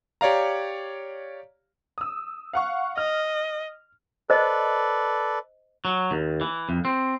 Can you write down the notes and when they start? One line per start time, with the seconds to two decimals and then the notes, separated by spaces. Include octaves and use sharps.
0.21 G4 C#5 D5 F5 A#5
1.98 D#6 E6
2.53 F5 F#5 C#6
2.97 D#5 F6
4.30 A4 B4 C5 D5 D#5
5.85 F#3
6.11 D#2
6.41 E3
6.69 F2
6.85 C4